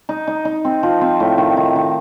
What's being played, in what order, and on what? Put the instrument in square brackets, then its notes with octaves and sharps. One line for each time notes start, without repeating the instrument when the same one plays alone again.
[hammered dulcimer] D#4
D#4
D#4
C4
F3
C4
A2
D#3
D#3
D#3